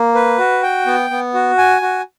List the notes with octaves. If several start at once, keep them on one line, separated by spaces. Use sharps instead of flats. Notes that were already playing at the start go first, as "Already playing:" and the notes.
Already playing: A#3
B4
F#4
G5
B3
B3
F#4
G#5
F#4